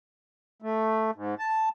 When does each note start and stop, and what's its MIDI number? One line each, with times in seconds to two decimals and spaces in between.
0.62 1.11 57
1.15 1.35 44
1.38 1.69 81